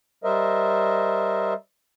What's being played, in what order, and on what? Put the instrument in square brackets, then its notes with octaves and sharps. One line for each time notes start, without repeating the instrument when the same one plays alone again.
[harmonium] G3 A#4 C5 D#5 E5